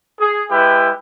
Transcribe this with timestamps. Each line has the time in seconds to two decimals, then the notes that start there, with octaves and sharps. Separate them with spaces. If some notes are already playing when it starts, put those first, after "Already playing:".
0.19 G#4
0.50 G#3 E4 G4 B4